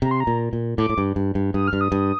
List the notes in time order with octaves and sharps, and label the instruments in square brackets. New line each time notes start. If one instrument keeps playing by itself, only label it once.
[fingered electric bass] C3 [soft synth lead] A#5
[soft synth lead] C6
A#5
[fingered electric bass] A#2
A#2
[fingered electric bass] A2 [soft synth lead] D6
[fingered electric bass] A2
G2
G2
G2
[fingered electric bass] G2 [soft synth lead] D#6
[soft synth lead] F6
[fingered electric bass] G2
[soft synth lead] D#6
[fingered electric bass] G2